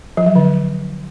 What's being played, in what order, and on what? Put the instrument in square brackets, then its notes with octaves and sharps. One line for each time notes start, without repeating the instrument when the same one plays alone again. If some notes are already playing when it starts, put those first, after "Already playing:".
[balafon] F3
F#3
D3